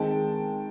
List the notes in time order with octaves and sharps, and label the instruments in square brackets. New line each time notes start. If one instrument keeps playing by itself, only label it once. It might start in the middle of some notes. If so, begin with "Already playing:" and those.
Already playing: [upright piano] D#3 G#3 C4 G5 A5